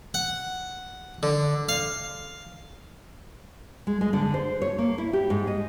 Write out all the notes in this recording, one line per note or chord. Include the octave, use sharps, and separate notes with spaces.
F#5
D3
F5
G#3
G#3
D3
C5
C#5
A#3
E4
G4
G#2
D#5